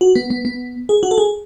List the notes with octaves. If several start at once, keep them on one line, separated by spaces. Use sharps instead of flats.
F#4
B3
B3
B3
G#4
F#4
A4
G#4